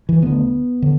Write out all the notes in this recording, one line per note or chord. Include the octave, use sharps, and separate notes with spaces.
E3
D2 D3 B3
D3